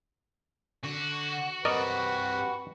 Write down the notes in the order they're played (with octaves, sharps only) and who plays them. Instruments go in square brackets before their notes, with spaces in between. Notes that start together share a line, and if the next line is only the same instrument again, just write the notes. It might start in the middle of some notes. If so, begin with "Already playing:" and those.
[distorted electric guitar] D3 [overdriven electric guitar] F#4
[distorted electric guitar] G2 C4 [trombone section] G4 B4 [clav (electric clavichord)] A#4 D5 D#5